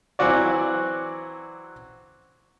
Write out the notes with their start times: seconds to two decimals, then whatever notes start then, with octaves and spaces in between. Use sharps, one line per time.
0.19 E3 F#3 C4 F#4 D5